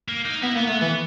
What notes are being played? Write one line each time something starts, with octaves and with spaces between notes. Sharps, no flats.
A#3
D#4
B3 E4
A#3 B3
A3 B3
E3 B3